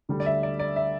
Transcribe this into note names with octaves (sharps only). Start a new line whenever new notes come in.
D2 D3 G3
D5
E5
D5
D5
E5